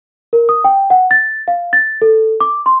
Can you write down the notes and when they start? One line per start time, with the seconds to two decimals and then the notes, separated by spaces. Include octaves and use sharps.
0.33 A#4
0.49 D#6
0.64 G5
0.90 F#5
1.11 A6
1.48 F5
1.73 A6
2.02 A4
2.40 D6
2.66 C6